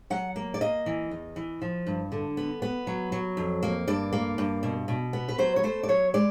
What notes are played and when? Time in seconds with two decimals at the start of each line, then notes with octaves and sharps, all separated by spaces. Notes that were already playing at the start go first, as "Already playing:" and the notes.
0.10 F#3 F#5
0.36 A#3
0.54 D5
0.61 A#3 D#5
0.86 E3
1.11 E2
1.36 E3
1.62 F3
1.87 G2
2.12 D3
2.37 B3
2.62 B3
2.87 F#3
3.12 F#3
3.37 F2
3.63 A#3
3.87 G2 D5
4.13 A#3
4.38 G2
4.63 B2
4.88 B2
5.13 B3
5.28 B4
5.38 F#3 C5
5.56 C#5
5.63 A3 C5
5.83 D5
5.88 F#3 C#5
6.14 G#3 D5